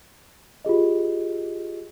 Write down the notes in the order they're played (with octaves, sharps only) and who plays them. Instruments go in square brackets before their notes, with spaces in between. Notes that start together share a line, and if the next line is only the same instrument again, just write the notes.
[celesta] F4 G4 G#4 D#5